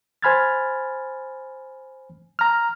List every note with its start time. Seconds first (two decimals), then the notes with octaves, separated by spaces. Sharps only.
0.22 C5 G#5 B5 F6 G#6 A6
2.39 A#5 F6